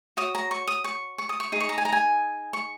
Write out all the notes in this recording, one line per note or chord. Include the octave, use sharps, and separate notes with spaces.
F#4 C#5 D#6
A#5
C#6
D#6
C#6
C#6
D#6
C#6
D#4 G#4
C#6
A#5
G#5
A#5
G#5
C#6